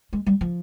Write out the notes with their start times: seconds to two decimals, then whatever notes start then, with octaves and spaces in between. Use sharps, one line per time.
0.13 G#3
0.26 G3
0.41 F3